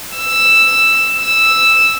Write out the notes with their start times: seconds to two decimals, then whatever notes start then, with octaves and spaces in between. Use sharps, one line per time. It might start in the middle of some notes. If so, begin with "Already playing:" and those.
0.16 E6
1.19 E6